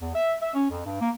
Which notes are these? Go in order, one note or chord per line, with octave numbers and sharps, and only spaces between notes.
E2
E5
E5
C#4
F2
G2
A#3